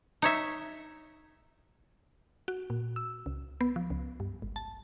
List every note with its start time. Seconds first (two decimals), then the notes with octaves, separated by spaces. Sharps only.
0.22 D#4 C#5 E5
2.48 F#4
2.70 A#2
2.96 E6
3.26 C#2
3.61 B3
3.76 F3
3.90 C#2
4.20 G2
4.42 G#1
4.56 A5